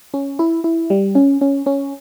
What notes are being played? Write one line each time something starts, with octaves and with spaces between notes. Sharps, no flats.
C#4
E4
E4
G3
C#4
C#4
C#4